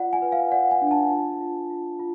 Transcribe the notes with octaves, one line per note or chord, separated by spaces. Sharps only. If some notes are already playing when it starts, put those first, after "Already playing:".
Already playing: F4 D5 F#5
G#5
B4
F5
D5 F#5
G#5
D4
G#5
A5
F4
F4
F4
F4